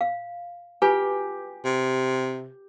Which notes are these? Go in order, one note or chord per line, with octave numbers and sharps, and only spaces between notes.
F5
F4 G4 B4 G#5
C3